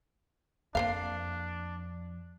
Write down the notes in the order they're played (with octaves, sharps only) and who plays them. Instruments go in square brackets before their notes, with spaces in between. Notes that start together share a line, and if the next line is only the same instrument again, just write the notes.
[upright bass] F2 [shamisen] A#3 C5 F5 [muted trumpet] D4